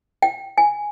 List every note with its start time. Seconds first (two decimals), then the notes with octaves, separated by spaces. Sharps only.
0.22 G5
0.58 G#5